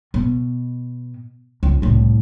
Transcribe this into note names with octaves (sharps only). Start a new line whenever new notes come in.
B2
C#2
C2 A2